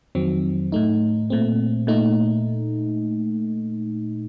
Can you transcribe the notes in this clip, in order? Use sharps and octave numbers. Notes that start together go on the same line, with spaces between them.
F2 D#3 F#3 C4
A2 A3 D#4
A#2 A3 C4
A#2 A3 D#4